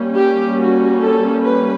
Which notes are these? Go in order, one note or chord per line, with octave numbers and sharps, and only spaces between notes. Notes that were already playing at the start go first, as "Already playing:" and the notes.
Already playing: G3 A#3 C#4
G4
F#4
A4
B4